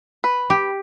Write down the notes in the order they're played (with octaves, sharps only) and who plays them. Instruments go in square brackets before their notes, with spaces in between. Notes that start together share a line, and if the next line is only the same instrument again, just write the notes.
[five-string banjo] B4
[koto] G4